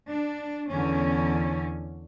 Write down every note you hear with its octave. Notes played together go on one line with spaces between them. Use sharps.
D4
E2 D3 C#4